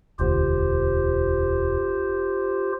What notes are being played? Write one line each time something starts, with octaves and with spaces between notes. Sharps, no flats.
E1 D2 F4 G4 C5